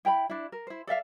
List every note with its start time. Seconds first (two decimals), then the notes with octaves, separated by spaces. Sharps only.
0.05 E4 G5 A#5 B5
0.30 D4 E4
0.52 A#4
0.67 E4 C5
0.87 A4 D5 E5 F5